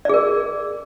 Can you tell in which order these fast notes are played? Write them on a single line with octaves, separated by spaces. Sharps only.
D5 G#4 A#4